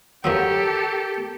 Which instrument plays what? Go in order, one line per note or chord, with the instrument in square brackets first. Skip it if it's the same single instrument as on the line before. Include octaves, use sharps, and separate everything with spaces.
[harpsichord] F#2 F3 F#3 [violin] G4 A4 [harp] A#4 E6